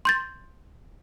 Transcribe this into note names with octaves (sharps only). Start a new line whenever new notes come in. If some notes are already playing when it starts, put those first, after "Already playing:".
C6 G6 A6